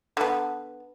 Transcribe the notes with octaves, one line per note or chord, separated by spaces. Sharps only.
D3 B3